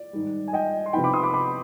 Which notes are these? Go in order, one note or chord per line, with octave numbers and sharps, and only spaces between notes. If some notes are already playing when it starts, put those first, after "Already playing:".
Already playing: D5
G#2 D#3 G3
G#5
D#5 G5
C6
C3 F3 B3 D#4 G5 B5
B5 D6
C6 D#6
B5 D6
B5 D6